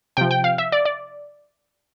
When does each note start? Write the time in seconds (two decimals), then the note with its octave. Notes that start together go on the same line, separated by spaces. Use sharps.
0.17 C3 F3 G5
0.31 G5
0.44 F5
0.58 E5
0.72 D5
0.85 D5